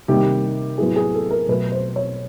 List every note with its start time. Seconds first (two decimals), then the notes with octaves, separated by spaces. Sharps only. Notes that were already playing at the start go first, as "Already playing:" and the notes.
0.08 C3 D#3 G3 A#3 G4
0.78 A2 F#3 B3 G#4
0.96 G#4
1.14 A4
1.30 A#4
1.48 B2 F#3 A3 B4
1.72 C5
1.96 C#5